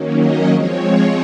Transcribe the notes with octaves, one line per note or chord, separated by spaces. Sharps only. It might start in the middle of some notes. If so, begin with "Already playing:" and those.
Already playing: D#3 F#3 A#3 C#4
D#5
F3 G#3 C4 C#5